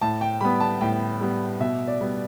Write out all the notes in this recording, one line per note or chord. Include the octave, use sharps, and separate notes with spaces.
A2 A5
G5
G3 B3 B5
A5
A2 G5
G3 B3
B2 E5
D5
G3 B3